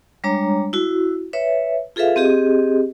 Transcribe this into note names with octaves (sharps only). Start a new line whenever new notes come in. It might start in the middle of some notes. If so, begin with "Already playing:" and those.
G3 G#3 D4 C#5 A#5
E4 F#4
B4 C#5 E5
F4 G#4 A4 B4 E5 F5
C4 G4 G#4 D#5